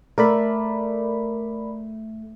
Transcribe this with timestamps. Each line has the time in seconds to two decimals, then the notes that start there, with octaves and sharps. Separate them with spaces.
0.18 A3 A#4 D5 B5